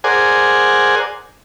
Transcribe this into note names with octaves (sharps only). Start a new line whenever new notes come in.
G#4 A#4 C5 D5 F#5 G#5